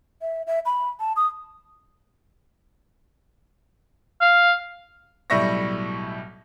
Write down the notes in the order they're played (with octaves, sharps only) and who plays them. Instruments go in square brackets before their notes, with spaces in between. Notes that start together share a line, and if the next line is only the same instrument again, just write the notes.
[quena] E5
E5
B5
A5
D#6
[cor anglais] F5
[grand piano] B1 A2 G3 E5 C#6 A#6